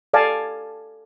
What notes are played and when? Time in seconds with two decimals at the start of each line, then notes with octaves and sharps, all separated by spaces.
0.13 A4 D5 F5 G#5 A5